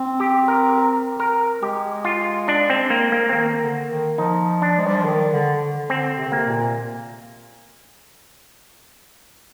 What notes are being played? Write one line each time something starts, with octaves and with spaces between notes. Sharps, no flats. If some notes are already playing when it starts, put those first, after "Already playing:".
Already playing: C4
G4
A#4
A#4
A#4
G#3 G4
F4
D4
C4
A#3
A#3
C4
D#3 A#3
D3
D#3
F3 D#4
D4
G#3
G3
F3
D#3
D3
D3
D3 C4
C3
D3
C3 A#3
A#2